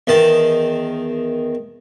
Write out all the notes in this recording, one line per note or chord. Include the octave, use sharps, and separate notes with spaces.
E2 D#3 A5